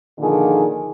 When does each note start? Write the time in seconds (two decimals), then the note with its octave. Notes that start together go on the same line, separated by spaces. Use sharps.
0.18 A#2 D3 D#3 F3 G#4